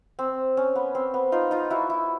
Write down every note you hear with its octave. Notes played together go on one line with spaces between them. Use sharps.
C4
C#4
B3
C4
B3
D#4 F4
D#4 F4
E4 F#4
E4